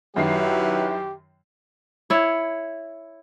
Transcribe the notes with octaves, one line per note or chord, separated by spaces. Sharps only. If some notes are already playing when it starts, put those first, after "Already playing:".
F#2 D#3 F#3 E4 G4 B4 C7
E4 C#5